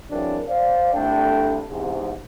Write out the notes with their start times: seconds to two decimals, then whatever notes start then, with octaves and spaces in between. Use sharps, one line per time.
0.11 C#3 E3 F#3 C4 D4 A#4
0.49 C5 D5 F5
0.94 C2 A3 D4 A4 G5
1.70 E2 G#2 C3